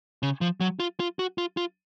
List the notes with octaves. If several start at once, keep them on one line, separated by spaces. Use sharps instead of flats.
C#3
F3
F#3
F4
F4
F#4
F4
F4